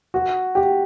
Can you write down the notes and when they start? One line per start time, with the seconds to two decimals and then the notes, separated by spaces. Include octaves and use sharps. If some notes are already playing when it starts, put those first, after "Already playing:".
0.14 F#4
0.55 G4